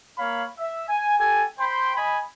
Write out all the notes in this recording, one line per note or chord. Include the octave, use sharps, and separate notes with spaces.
A#3 C#5 F5 B5
E5
G#5
G4 A4 G#5
C5 G5 B5 C6
D#5 G#5 B5